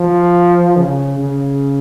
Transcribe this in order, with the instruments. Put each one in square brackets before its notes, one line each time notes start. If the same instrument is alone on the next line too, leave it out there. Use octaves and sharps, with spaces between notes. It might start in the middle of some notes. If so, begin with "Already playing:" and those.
Already playing: [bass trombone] F3
C#3
C#3